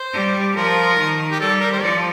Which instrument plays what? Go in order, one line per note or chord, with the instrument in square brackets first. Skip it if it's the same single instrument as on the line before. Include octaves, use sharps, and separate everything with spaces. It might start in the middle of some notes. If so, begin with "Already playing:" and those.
Already playing: [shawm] C5
[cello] G3
[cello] F3 [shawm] A#4
[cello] D#3
[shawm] G4
[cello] G3 [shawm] A4
[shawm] A#4
C5
[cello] F3 [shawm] D5